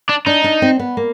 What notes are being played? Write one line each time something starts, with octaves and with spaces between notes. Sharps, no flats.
D4
D4 D#4
D4
C4
B3
A#3